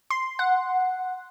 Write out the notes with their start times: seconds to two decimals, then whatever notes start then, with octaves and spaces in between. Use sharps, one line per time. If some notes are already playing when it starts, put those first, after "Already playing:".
0.10 C6
0.39 F#5